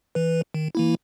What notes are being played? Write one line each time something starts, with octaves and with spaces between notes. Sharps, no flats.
E3 B4
D#3
E3 A#3 E4